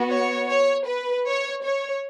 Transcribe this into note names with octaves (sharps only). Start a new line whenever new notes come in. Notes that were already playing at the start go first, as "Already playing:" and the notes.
Already playing: B3 F#4
C#5
C#5
B4
C#5
C#5